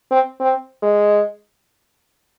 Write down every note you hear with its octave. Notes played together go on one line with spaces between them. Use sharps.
C4
C4
G#3